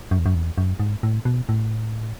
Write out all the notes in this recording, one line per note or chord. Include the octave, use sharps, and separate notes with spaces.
F#2
E2
F#2
E2
F#2
G#2
A2
B2
A2